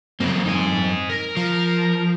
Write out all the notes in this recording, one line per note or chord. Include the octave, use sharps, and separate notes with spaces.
F#2 F#3 A#3 C4
D#4 G#5
A#4
F3